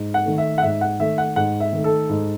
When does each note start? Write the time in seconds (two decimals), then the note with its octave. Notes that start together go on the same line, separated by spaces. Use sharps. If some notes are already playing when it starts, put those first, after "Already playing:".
Already playing: G#2
0.14 F#5
0.26 D#3 A3
0.38 E5
0.58 F#5
0.62 G#2 E5
0.81 F#5
1.00 D#3 A3 E5
1.18 F#5
1.36 G#2 F#5
1.60 E5
1.73 D#3 A3
1.84 A4
2.09 G#2